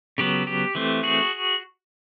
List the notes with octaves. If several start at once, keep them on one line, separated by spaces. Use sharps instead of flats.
C#3 F#3 B3 G4
G4
E3 A3 C4
F#4 G#4